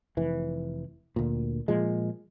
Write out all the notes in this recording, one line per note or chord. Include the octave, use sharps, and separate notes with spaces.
F1 E3
D2 A#2
A#2 F3 G#3